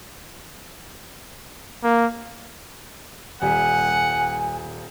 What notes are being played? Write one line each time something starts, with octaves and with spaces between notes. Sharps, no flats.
A#3
D#1 G3 F#5 G#5